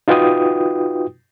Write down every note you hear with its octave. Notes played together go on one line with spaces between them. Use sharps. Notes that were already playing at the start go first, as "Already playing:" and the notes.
D#4 F4 F#4 B4 G5 D#6